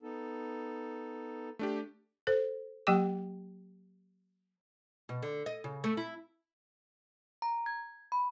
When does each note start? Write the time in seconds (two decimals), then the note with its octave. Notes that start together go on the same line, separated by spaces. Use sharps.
0.02 B3 D#4 A4
1.59 A3 D4 G4
2.27 A4 C5
2.87 F#3 A#3 G4 G5 D6
5.09 B2
5.22 D3
5.46 D#5
5.64 C#3
5.84 A3
5.97 E4
7.42 A#5
7.66 G#6
8.12 B5